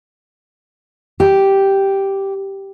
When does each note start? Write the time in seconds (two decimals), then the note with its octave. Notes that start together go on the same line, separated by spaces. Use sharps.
1.20 G4